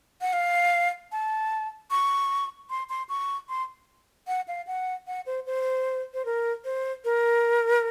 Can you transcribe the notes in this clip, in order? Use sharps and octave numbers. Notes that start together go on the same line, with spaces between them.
F#5
F5
A5
C#6
C6
C6
C#6
C6
F#5
F5
F#5
F#5
C5
C5
C5
A#4
C5
A#4